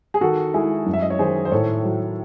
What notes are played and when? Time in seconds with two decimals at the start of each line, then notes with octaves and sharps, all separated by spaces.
0.14 G#4
0.21 D#3 F#4 A4
0.54 G#3 E4 G#4
0.86 F#2
0.93 E5
1.02 D#5
1.10 C#5
1.19 D#3 G#4 C5
1.45 C5
1.51 A2 A4 C#5
1.84 F#3